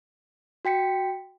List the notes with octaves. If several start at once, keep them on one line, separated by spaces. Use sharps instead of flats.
F#4 G5 B6 C#7